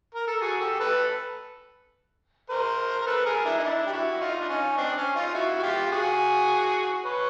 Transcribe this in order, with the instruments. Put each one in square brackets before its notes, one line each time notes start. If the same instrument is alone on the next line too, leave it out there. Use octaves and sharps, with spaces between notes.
[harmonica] A#4
A4
F#4 G#4
G4 A4
A4 B4
A#4 C5
A#4
A4 B4
G#4 A#4
D4 E4
D#4
D4 E4
G4
E4 F#4
E4
D#4 F4
D4
C#4 D#4
C4 D4
C#4
D#4 F4
E4 F#4
F#4
F4 G4
G4
F#4 G#4
B4 C#5